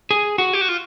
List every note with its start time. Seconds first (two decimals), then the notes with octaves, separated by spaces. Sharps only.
0.11 G#4
0.38 F#4
0.53 G4
0.61 F#4
0.69 F4